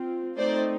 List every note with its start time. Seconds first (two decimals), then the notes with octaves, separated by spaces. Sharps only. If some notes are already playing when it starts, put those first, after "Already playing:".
Already playing: C4 F4
0.37 A3 C4 D#4 C5 D5